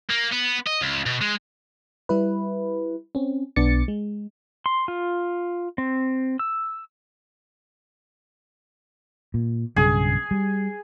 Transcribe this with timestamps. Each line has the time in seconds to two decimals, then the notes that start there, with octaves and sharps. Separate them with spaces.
0.09 A#3
0.32 B3
0.66 D#5
0.81 C#2
1.06 B2
1.21 G#3
2.09 G3 E4 B4
3.15 C4 C#4
3.56 B1 B3 D4 D6 A6 C#7
3.88 G#3
4.66 C6
4.88 F4
5.78 C4
6.39 E6
9.34 A#2
9.76 B1 G2 C#3 G#4
10.31 G3